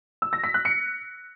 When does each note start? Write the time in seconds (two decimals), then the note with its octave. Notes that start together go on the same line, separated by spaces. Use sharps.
0.22 E6
0.33 A#6
0.44 B6
0.54 F#6
0.65 C#7